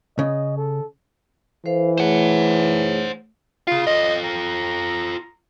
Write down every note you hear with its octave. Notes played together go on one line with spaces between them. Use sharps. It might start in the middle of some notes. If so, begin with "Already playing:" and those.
C#3 D#5
A4
E3 A4 C5 F5
A3 G#4 C5 C#5 F#5
F4 G#4 F5
F4 A4 D#5
A#5